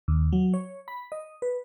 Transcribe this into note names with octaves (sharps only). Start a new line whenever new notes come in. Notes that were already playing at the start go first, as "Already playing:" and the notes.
D#2
F#3
C#5
B5
D#5
B4